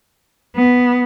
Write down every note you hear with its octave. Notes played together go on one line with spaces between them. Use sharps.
B3